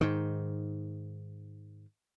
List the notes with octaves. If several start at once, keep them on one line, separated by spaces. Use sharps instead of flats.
G#2 D#3